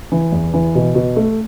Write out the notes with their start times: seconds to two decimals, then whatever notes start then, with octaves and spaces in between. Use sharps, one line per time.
0.12 E3
0.32 E2
0.54 E3
0.75 B2
0.95 B2
1.16 A3